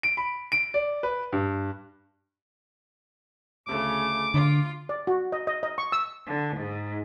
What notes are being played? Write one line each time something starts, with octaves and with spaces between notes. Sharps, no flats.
D7
B5
D7
D5
B4
G2
D2 C#3 A3 D6
D3 F4
D5
F#4
D#5
D#5
D#5
C#6
E6
D3
G#2